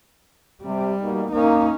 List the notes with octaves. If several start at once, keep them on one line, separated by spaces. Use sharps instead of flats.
C3 G3
B2 A#3 D#4
A#3 C#4 D#4